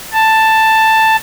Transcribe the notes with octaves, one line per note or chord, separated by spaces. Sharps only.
A5